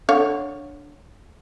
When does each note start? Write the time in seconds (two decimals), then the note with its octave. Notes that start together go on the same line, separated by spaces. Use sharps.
0.09 D3 C#5 F5